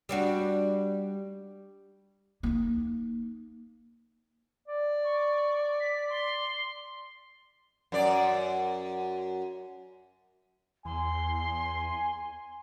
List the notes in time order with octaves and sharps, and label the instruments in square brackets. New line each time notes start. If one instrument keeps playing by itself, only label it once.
[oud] G3 D4 F#4
[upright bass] A#3 D#4
[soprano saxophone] D5
[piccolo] C#6
B6
C6
[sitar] F#2 D5
[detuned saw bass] E2 [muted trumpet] G#5 [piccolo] C6